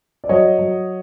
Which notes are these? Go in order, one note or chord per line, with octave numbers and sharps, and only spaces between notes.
D5
F#3 C#5 D#5
F#3